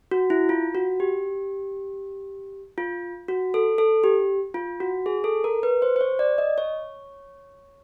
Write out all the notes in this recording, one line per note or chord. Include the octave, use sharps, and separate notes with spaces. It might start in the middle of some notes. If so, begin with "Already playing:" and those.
F#4
E4
F4
F#4
G4
F4
F#4
A4
A4
G4
F4
F#4
G#4
A4
A#4
B4
C5
C5
C#5
D5
D#5
C#5